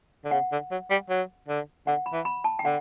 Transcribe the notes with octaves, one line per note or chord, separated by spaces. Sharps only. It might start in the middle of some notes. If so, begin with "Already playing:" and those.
D3
C#3 F#5
D3
F#3
G3
F#3
D3
D3 F#5
B5
E3
B5
A5
G5
D3 F#5